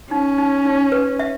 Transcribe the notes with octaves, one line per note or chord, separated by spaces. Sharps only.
C#4 D#4
D#4
D#4
B4
E5